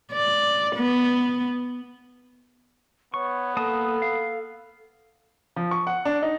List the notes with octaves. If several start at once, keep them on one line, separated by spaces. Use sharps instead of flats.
D5
B3
B3 C#5 C#6
A#3 A4 A5 D#6
F5
F3
C#6
F#5
D4
D#4